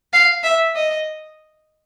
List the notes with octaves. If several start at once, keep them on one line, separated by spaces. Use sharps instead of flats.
F5
E5
D#5